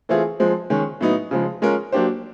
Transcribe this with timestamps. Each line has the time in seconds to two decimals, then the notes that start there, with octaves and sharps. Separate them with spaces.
0.09 E3 A3 C4 F4 G#4
0.40 F3 G#3 C4
0.70 D#3 G#3 C#4
1.01 A2 F#3 B3 D#4
1.31 C#3 F3 G#3
1.62 G#3 C#4 F4 A#4
1.92 F#3 A#3 D4 G4 C5